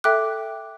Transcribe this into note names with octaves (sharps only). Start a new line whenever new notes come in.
A4 E5 G5 D6 F#6